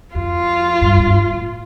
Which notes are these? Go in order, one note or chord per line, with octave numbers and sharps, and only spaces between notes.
F2 F4
G2
G2
A2